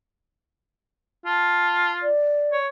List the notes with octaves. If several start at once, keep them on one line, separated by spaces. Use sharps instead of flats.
F4 A5
D5
C#5